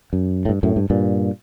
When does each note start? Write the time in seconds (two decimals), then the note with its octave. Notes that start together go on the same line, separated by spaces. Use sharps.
0.13 F#2
0.45 A2
0.49 G2
0.63 F#2 A2
0.76 G2
0.90 G2 A#2